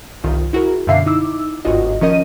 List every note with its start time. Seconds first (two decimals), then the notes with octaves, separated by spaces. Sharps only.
0.24 G1 C2 D#3 F4
0.53 E4 F#4 G#4 A#4
0.87 F#2 B2 D3 E5 F5 C7
1.06 D#4 E4 D6 E6
1.65 G1 D2 G#2 F4 F#4 D#5
2.01 D#3 F3 C#4 A#4 D#5 D#7